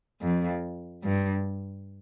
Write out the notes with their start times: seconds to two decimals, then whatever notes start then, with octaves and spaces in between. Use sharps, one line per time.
0.22 F2
1.04 G2